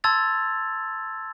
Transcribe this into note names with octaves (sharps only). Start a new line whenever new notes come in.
A5 C6 E6 G#6 A6 F7